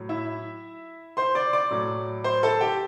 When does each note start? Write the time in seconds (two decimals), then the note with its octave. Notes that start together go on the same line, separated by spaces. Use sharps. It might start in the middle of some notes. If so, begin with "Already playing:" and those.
Already playing: A2 F#3
0.09 E4 E5
1.17 C5 C6
1.35 D5 D6
1.53 D5 D6
1.71 A2 F#3
2.24 C5 C6
2.43 A4 A5
2.61 G4 G5